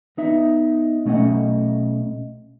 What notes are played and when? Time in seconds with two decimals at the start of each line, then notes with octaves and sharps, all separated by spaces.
0.17 B3 D#4 E5
1.05 B1 A3 C#4 D#5 F#5